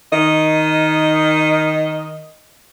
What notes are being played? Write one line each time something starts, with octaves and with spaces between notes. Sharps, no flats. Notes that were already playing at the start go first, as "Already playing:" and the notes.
D#3 D#5